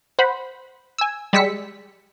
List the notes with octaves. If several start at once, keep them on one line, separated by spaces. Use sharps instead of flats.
C5 F#5 B5
G#5 E6
G3 G#3 E6 B6 C#7